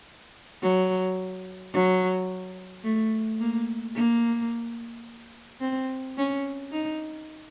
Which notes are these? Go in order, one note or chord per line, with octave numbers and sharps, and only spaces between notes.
F#3
F#3
A3
A#3
A#3
C4
C#4
D#4